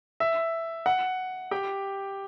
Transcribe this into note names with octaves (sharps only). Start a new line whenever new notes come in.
E5
F#5
G4 G5